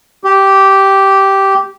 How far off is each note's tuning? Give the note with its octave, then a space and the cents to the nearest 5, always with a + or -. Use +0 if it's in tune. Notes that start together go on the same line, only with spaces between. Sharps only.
G4 -10